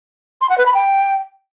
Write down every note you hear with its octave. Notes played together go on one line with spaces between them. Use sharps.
C6
F#5
B4
B5
G5